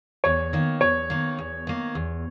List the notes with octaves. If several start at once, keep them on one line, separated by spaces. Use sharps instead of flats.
E2 C#5
D#3 A#3
E2 C#5
D#3 A#3
E2
D#3 A#3
E2